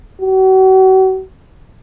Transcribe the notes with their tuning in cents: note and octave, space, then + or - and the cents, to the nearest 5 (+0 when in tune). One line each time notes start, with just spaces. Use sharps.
F#4 +40